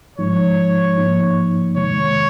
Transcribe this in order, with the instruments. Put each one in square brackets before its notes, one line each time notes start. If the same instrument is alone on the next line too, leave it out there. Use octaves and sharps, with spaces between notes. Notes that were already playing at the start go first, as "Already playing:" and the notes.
[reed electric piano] G#2 F3 G#3 D#4 [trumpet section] C#5
[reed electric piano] G#2 F3 A#3 D#4
[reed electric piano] F2 C3 D#3 G#3 [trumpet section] C#5